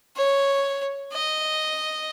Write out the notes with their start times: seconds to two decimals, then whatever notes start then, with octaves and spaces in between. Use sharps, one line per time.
0.16 C#5
1.13 D#5